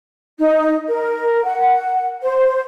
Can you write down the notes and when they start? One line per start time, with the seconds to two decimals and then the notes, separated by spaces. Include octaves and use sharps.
0.39 D#4
0.87 A#4
1.45 F#5
2.22 C5